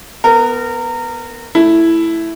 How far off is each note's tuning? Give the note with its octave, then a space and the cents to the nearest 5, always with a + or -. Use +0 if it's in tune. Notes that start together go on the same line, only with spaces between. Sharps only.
B3 +0 A#4 -25
A3 +0 E4 +0